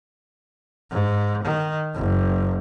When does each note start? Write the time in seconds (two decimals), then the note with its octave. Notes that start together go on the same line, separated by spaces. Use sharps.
0.91 G#2
1.44 D#3
1.96 F#1